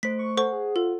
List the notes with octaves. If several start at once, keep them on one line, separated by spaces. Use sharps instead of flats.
A3 C5 B6
C#6
A4 C5 F#5 C#6
G#4
F4 A4